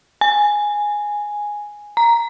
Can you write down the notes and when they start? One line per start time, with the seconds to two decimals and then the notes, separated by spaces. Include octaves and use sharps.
0.21 G#5
1.97 A#5